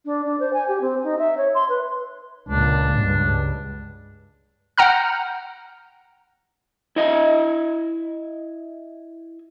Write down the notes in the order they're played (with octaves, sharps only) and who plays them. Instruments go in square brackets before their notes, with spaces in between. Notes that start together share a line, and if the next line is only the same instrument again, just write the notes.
[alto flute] D4
D4
C5
G#5
G4
C4
D#4
E5
C#5
C6
B4
[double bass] C#2 A#2 [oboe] D4
[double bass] C#2 G2
[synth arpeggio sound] F#5 G5 A#5 F6
[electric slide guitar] E4 D#5 E5